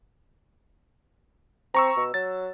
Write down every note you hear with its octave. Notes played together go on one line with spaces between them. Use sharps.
C4 A#5 C#6 E6
B2
F#3 A6